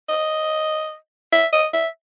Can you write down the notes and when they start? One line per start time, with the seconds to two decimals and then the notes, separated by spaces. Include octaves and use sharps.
0.09 D#5
1.32 E5
1.53 D#5
1.73 E5